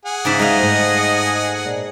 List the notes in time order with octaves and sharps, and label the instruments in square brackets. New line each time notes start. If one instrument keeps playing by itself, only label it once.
[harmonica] G#4 F#5
[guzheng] G#2 C#3 E5 [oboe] D6
[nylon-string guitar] G#3 [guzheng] D#4 F5 [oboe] D#5
[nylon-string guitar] G#2 A3 C5
A#2